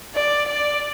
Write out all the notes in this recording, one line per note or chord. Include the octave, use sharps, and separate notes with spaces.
D5
D5